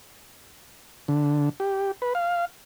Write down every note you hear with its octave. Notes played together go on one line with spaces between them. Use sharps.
D3
G4
B4
F5